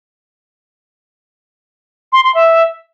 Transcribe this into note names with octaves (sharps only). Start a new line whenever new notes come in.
C6
C6
E5